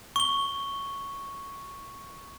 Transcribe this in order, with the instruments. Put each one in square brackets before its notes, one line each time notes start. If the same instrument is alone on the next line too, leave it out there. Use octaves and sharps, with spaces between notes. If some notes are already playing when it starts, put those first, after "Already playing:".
[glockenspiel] C#6 G7